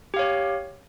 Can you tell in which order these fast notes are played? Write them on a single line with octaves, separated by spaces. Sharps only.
G4 F5 C#5